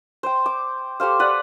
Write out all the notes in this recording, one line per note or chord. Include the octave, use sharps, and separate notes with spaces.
C5 G5
D6
G4 A4 C5 F5
B4 D5 F#5